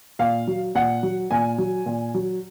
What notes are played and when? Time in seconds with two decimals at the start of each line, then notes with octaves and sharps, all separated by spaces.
0.19 A#2 F5
0.47 F#3
0.75 A#2 F#5
1.03 F#3
1.31 A#2 G#5
1.58 F#3
1.86 A#2
2.14 F#3